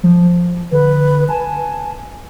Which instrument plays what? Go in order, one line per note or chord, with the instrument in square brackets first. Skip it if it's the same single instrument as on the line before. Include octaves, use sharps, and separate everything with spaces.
[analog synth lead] F3
[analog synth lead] D3 [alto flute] B4
[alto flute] G#5 [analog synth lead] A5